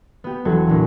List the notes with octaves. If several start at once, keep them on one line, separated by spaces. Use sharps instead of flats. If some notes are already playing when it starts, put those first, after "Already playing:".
B3 G4
E1 F#3 A4 G#6
A#1 E3